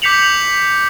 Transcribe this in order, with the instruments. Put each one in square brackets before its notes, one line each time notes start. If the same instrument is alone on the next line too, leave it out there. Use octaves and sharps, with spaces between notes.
[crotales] D6 G6 B6 C#7 F7 F#7